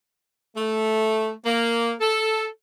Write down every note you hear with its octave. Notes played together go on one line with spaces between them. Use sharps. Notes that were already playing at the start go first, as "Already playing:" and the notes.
A3
A#3
A4